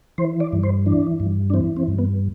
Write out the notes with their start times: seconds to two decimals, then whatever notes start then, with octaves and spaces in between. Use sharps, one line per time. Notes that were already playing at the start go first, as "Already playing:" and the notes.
0.18 E3 C5
0.40 D5
0.53 G2
0.63 C5
0.86 E3 D4
1.20 G2
1.50 D4
1.54 E3 C4
1.77 C4
1.88 G2
1.99 B3